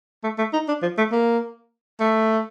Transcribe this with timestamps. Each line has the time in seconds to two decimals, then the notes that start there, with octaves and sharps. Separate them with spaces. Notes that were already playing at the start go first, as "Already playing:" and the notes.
0.23 A3
0.38 A3
0.53 D#4
0.68 D4
0.82 F3
0.98 A3
1.12 A#3
2.00 A3